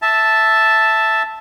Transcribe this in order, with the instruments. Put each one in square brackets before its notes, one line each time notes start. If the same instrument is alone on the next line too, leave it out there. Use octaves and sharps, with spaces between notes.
[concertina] E5 A5